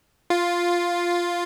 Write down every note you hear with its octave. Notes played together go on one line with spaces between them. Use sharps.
F4